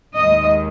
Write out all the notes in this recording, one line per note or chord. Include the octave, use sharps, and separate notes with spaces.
D#2 D#3 G#3 D#5